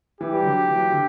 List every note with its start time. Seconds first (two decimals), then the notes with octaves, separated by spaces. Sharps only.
0.21 E3 G4
0.33 G3
0.43 D3 F#3
0.68 E3
0.75 F#3
0.82 E3
0.92 D3